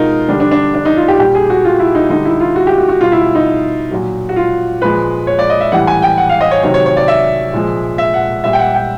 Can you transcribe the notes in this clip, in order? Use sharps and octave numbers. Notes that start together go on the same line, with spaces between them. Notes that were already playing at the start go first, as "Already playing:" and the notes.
Already playing: B2 G#3 D#4 F4 A#4
D3 G3 D4
D4
D4
D4
D#4
F4
G4
A#2 G3 G4
G#4
F#4
F4
E4
D#4
D3 G3 D#4
E4
F4
F#4
G4
F#4
F#4
B2 G3 F4
E4
D#4
A#2 F#3
F#4
F4
A#2 F3 G#3 B4
C#5
D5
D#5
E5
A2 E3 G3 F#5
G#5
G5
F#5
F5
D#5
C#5
C3 D#3 F#3 C#5
C#5
C#5
D5
E5
A#2 F3 G#3
E5
F#5
A#2 G3 E5
G5
F#5
G5